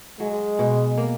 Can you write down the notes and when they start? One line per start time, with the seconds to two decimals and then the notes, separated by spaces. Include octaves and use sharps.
0.20 F#3 G#3
0.59 B2
0.98 A#3